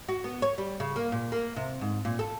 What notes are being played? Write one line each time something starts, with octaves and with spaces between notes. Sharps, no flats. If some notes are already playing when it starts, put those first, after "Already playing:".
F#4
B3
C#5
G3
C#3
A#3
A#2
A#3
C3
G#2
A#2
A4